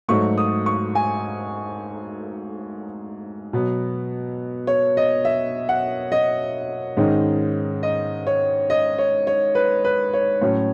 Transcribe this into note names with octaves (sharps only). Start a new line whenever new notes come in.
G#2 F#3 A3 C#6
D#6
C#6
G#5
B2 F#3 B3
C#5
D#5
E5
F#5
D#5
G#2 D#3 G#3 C#4
D#5
C#5
D#5
C#5
C#5
B4
B4
C#5
A2 F#3 C#4